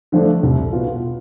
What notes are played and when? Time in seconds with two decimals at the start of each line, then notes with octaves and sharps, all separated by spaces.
0.12 D3 F3 A3 D4
0.43 C2
0.73 B2 B3 F4